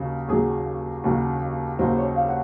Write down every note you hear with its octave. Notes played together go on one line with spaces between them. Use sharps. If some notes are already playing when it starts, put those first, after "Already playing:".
Already playing: D#2 C#3 F#3
D#2 C#3 F#3 G#4
D#2 C#3 F#3
D#2 C#3 F#3 C5
C#5
F5
F#5